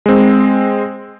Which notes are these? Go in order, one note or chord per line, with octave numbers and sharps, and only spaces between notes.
G#3 C4